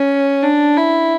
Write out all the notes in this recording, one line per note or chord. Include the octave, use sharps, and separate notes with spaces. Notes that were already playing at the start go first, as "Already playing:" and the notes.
Already playing: C#4
D4
E4